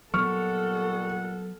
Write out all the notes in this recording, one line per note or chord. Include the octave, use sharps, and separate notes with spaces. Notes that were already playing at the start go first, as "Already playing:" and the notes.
A#2 F#3 G3 B3 A4 F#5 C#6 F6